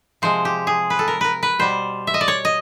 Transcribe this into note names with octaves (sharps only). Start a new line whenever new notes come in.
C3 F3 G#3 C5
G4
G#4
B4
A4
A#4
A#4 B4
B4
B2 G3 C5
E5
D#5
D5
C#5
D#5